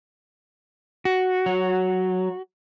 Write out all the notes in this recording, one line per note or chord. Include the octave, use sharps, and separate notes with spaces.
F#4
F#3